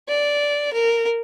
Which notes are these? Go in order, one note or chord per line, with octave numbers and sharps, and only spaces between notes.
D5
A#4